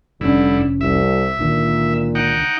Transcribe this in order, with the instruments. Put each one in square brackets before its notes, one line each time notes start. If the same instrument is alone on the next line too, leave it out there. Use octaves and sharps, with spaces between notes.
[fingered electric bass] F1 C#4 [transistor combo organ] G2 E4 [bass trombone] D3
[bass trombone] C2 [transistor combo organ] E5
[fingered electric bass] C#2 D3 D#3 [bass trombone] A#2
[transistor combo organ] D#4 F#5 G5